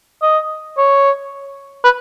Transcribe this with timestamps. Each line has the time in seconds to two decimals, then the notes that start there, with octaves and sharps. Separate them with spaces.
0.22 D#5
0.77 C#5
1.84 B4